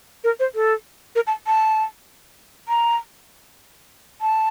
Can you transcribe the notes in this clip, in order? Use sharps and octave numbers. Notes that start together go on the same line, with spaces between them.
A#4
C5
A4
A#4
A5
A5
A#5
A5